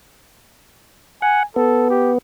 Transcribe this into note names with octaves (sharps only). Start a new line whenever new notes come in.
F#5 G#5
B3 A4
G4